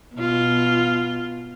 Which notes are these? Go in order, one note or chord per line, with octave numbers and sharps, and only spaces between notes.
B2 F4